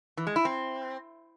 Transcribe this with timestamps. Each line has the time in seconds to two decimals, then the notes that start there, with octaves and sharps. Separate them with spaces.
0.17 E3
0.27 G#3
0.36 E4
0.45 C4